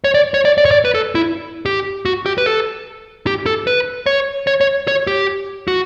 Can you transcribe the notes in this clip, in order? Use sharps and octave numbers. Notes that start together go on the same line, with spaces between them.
C#5
D5
C#5
D5
D5
C#5
D5
B4
A4
E4
G4
F#4
G4
B4
A4
G4
A4
B4
C#5
C#5
C#5
C#5
G4
F#4